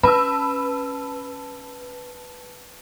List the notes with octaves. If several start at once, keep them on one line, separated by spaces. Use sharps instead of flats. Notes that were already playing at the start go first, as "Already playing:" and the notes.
C#4 B4 A5 B5 E6